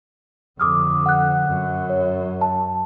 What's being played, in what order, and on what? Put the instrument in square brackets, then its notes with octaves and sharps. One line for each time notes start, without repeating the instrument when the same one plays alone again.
[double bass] F2 D3 [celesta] D6 D#6 F6
[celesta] F#5 F#6
[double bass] F#2
[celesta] C#5
A5